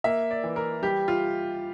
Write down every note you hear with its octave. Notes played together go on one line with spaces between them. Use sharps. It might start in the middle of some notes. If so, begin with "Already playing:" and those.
A#3 E5
D5
E3
A#4
G3 G4
F4